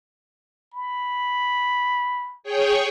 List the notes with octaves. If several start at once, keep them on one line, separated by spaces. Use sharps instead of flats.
B5
G#4 C#5 G5